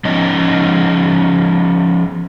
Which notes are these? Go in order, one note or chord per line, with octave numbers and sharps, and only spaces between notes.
F3 B3 C#4 D#4 D#5